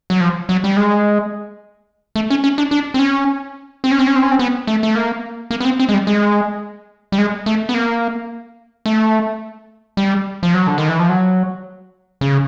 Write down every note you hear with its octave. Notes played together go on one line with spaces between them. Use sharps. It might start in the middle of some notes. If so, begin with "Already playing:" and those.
F#3
F3
F#3
G3
G#3
A3
C#4
C#4
D4
D4
C4
C#4
C4
C#4
C4
C#4
C4
C#4
C4
B3
A3
A3
A#3
A#3
B3
C4
C4
G#3
G3
G#3
G3
G#3
A3
B3
A#3
A3
G3
F3
F#3
D3
D#3
E3
F3
F#3
C#3